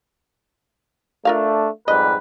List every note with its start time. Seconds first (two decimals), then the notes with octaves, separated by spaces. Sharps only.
1.25 A3 D4 F4 A#4 F5
1.88 F2 G#2 G3 B4 D#5